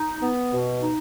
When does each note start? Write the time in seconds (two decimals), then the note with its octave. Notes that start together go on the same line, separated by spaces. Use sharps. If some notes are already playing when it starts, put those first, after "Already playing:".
Already playing: D#4
0.20 B3
0.52 B2
0.82 D#4